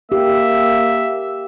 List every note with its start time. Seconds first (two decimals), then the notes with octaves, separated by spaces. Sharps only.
0.12 A#3 G4 E5